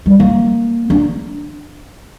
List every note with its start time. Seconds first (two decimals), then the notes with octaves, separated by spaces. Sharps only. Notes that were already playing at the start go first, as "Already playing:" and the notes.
0.06 G3
0.20 A#3
0.90 D4